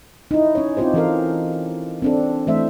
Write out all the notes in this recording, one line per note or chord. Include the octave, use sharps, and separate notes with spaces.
D#4 E4
C#4 C#5
C4 C#4 D#4 F4 G4 C5
E3 C#4 A4 A#4 F5
C4 D4 A4
E3 A3 C4 C5 E5